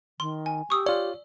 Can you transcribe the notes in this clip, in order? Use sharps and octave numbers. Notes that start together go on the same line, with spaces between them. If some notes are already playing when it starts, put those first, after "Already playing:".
D#3 C6
G#5
G4 C#6 D#6 E6
F4 C#5 D5